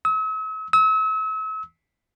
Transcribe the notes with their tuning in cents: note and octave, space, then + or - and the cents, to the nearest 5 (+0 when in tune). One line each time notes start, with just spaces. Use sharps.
E6 -45
E6 -40